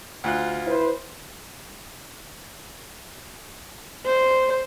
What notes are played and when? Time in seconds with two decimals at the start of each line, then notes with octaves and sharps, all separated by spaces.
0.24 D2 F4 F#6
0.66 E4 B4 C5
4.06 C5